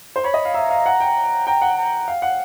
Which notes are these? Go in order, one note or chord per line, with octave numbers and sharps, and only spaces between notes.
C5
C#5 B5
D#5
F5
E5 A#5
F5
F#5
G5
G5 A#5
F#5
A#5
F5
F#5